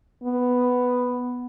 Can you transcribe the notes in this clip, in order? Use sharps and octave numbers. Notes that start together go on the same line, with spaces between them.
B3